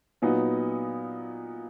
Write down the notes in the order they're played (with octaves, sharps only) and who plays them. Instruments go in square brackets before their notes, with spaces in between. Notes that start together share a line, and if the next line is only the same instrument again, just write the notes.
[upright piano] A#2 F#3 B3 D#4